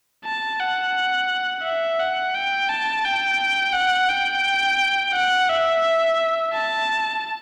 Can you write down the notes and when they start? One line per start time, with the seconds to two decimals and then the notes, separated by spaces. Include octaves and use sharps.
0.25 A5
0.59 F#5
1.63 E5
2.00 F#5
2.35 G5
2.69 A5
3.05 G5
3.74 F#5
4.09 G5
5.14 F#5
5.49 E5
6.53 A5